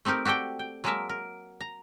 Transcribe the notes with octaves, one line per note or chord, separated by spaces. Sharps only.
A3 C4 D#4 G4 A#4
F#4 G4 A4 D5 G5
G5
F#3 G#3 A#3 A#4 E5 A5
A#4
A#5